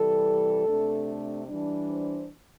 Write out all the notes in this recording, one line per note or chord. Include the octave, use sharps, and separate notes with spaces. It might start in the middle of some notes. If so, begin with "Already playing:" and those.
Already playing: C3 E3 G3 A4
C3 A3 D4
E3 G3 D4
C5